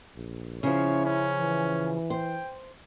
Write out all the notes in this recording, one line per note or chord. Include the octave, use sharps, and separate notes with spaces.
A#1
C#3 F3 E4 C#5
C#4
E3
C5 G5